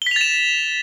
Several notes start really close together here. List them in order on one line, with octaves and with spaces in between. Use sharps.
G7 B6 F7 A6 E7